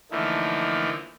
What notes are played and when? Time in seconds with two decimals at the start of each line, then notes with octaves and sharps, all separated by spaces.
0.11 D3 E3 F3 A3 A#3 D#4